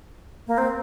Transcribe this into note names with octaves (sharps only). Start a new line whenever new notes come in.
A#3
C4